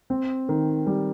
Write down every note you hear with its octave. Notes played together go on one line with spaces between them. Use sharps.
C4
D#3
G3